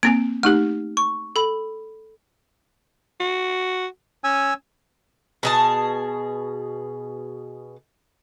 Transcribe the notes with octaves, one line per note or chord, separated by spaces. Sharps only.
A#3 C4 G#5 D7
A3 D#4 G4 F6
C#6
A4 B5
F#4
C#4 G#5 E6
B2 G#4 A5